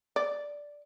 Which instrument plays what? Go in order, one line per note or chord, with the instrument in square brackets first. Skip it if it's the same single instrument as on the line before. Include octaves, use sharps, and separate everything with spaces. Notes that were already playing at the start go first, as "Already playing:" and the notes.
[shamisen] D5